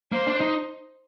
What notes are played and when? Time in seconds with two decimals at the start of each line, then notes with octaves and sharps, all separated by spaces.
0.12 A#3 C5
0.27 D4
0.41 D#4